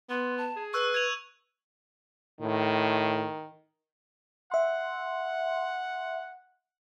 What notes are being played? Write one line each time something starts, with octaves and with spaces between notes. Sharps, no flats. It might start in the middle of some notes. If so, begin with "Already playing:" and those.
B3 C6
A5
G#4
B4 C#6 E6 F#6
G#6 D#7 F7
A2 D#3
E5 F#5 C6